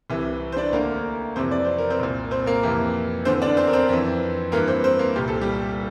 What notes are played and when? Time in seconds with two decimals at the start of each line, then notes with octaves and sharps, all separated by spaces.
0.10 C2 C3 E3
0.52 C5
0.57 D4 D5
0.73 D2 D3 A#3 A#4
1.36 F2 C3 E3 C4 C5
1.51 D5
1.65 C5
1.78 A#4
1.90 C4 C5
2.00 C2 A#2
2.31 C4 C5
2.46 A#3 A#4
2.63 F2 C3 E3
3.25 E2 D3 C4 C5
3.42 D4 D5
3.57 C4 C5
3.67 A#4
3.73 C4 C5
3.89 F2 E3
4.52 G2 E3 A#3 A#4
4.68 C4 C5
4.84 C4 C5
4.99 A#3 A#4
5.16 C2 A#2 G4
5.28 A4
5.41 G3 G4